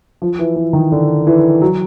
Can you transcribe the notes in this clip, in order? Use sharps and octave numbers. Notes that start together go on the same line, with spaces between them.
F3
E3
E3
D#3
D3
E3
F#3